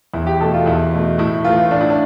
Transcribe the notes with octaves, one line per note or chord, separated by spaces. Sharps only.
E2 E4
G4
B2 A3 A4
F4
E2 E4
B2 A3
A2 E4
E3 A3 F4
A2 D4
E4
D4